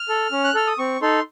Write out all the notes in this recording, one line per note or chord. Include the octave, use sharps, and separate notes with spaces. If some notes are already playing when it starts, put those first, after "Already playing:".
Already playing: F6
A4
C#4
F#6
A4 F6
D#6
C4 C#6
D#4 A4 C6